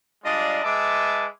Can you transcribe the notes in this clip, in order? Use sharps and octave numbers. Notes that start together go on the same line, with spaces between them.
G3 G#3 D4 F4 D5 D#5
G#3 B4 E5 A5 D6